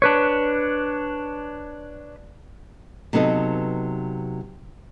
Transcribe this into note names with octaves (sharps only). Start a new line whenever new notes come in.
D4 B4 C#5
C3 F#3 B3 D#4 A4